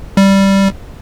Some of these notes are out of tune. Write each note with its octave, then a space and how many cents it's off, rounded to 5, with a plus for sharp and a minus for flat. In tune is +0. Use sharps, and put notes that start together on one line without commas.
G3 -5